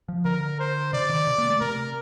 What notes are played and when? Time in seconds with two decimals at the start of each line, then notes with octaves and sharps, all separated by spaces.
0.08 F3
0.25 D3 A#4
0.60 C5
0.93 C3 D5
1.09 D#3
1.27 C3
1.38 A#3
1.50 A3
1.61 C3 A#4